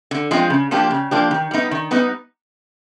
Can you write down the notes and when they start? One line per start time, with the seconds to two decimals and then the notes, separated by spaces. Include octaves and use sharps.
0.11 D3
0.31 F3 G#3 C4
0.50 C#3
0.71 F3 A#3 D4 G4
0.91 C#3
1.11 F3 A#3 D4 G4
1.31 D#3
1.51 G3 B3 D#4
1.71 D#3
1.91 G3 B3 D#4